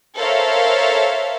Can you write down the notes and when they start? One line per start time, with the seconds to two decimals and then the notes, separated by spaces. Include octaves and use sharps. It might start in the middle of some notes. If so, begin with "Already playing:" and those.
0.16 A4 A#4 C5 C#5 E5 F5